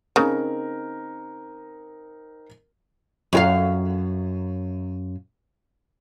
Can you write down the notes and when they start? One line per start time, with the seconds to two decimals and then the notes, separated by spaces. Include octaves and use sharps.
0.16 C#3 C4 D#4 A#4
3.33 F#2 G4 F5